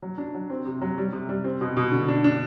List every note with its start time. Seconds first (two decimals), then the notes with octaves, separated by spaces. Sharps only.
0.02 F#3
0.18 D4
0.34 F#3
0.50 C4
0.65 C3
0.81 F#3
0.98 G3
1.13 C3
1.29 G3
1.44 C4
1.61 B2
1.77 B2
1.92 D3
2.08 D4
2.24 D4